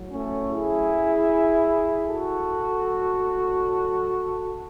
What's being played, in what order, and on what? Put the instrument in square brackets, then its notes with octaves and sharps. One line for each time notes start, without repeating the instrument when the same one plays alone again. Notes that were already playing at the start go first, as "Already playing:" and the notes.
Already playing: [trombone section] A2 F#3
A3 C#4
E4 G#4
F#4 A4
A2 F#3